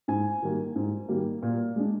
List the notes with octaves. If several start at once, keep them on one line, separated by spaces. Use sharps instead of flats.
G#2 G#5
D#3 G3 A#3
G#2
D#3 G3 A#3
A#2
G#3 D4